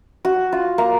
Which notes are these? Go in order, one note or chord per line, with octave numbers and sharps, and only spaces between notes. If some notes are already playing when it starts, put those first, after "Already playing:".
F#4
F4
A#3